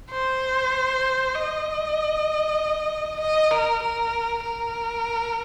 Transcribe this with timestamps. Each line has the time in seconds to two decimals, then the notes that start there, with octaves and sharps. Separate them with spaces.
0.11 C5
1.35 D#5
3.20 D#5
3.51 A#4
3.82 A#4
4.44 A#4